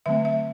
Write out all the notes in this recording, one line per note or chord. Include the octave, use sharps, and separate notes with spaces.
D3 F#3 A3 C4 E5
E5